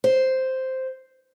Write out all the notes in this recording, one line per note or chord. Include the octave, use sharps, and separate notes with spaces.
C5